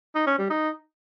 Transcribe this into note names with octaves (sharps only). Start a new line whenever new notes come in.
D#4
C#4
G3
D#4